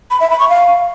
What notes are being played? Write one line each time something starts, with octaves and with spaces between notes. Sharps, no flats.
B5
E5
B5
C#6
F5